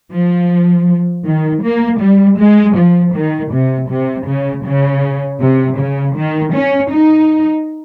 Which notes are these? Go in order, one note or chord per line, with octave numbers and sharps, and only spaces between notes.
F3
D#3
A#3
G3
G#3
F3
D#3
C3
C3
C#3
C#3
C3
C#3
D#3
C#4
D#4